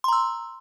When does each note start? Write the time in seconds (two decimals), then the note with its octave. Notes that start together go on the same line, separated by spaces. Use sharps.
0.04 C6
0.08 A#5
0.13 E6